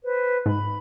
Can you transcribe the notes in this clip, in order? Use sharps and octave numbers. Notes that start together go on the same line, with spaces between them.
B4 C5
G#2 B5